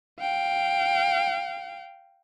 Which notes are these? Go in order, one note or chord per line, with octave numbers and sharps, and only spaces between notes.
F5 G5